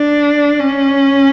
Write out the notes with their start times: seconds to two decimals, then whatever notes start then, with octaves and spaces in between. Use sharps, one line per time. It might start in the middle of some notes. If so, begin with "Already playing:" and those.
Already playing: D4
0.60 C#4